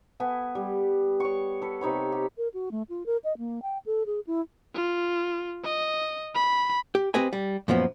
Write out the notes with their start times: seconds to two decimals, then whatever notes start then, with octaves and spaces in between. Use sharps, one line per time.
0.20 B3 A4 G#5
0.55 G3
1.20 C#5 C#6
1.62 A4 B4
1.81 C3 D#4 C#5 B5
2.12 G4
2.38 A#4
2.54 F#4
2.72 A3
2.89 F4
3.06 A#4
3.24 D#5
3.38 A#3
3.62 G5
3.86 A4
4.06 G#4
4.27 E4
4.75 F4
5.64 D#5
6.35 B5
6.95 G4
7.14 C4 G4 B4 D#5 G#5
7.33 G3
7.68 F#2 A#2 F3 B3